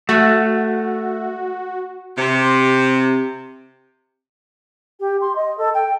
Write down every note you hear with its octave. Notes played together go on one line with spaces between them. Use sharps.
A3 F#4
C3
G4
C6
D#5
A4
G5